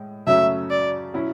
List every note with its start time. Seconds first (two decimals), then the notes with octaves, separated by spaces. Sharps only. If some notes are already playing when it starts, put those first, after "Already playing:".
Already playing: A2 G#3
0.27 F#2 C#3 F#3 A3 C#4 E5
0.70 D5
1.14 B2 F#3 C#4 E4